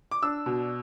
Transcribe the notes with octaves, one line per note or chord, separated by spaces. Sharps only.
D6
D4 E6
B2